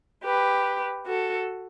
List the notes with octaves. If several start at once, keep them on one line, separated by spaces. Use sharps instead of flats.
G4 B4
F#4 A4